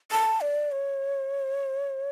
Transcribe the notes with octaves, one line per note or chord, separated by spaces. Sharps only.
A5
D5
C#5